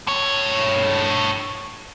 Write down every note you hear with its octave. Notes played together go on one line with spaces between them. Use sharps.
G2 C#5